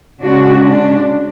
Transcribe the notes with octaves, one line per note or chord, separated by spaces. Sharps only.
C#3 G#3 C#4 D4 F#4
D4